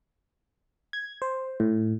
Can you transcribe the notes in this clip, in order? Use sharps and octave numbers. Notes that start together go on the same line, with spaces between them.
G#6
C5
A2